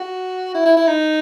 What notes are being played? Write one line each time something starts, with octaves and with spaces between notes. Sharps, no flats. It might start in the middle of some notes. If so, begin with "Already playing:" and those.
Already playing: F#4
E4
E4
E4
D#4